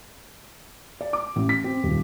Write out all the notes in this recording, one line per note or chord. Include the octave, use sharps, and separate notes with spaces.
D5
D6
A1
B6
C4
D#1